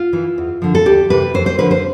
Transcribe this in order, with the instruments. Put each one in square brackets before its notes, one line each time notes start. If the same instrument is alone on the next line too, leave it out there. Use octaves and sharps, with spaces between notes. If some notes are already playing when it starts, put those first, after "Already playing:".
Already playing: [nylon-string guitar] F4
E3
E2
D3 F3
A4
D2 G4
C3 E3 B4
F2 C5
C5
D3 F3 B4
C5